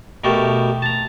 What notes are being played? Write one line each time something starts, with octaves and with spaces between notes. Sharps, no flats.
B2 A3 F#4 G4 A#4
A5 A#5